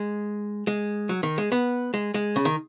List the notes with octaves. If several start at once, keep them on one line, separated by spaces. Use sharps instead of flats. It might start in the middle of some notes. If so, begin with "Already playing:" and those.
Already playing: G#3
G#3
F#3
D#3
G#3
B3
G#3
G#3
C#3
D#3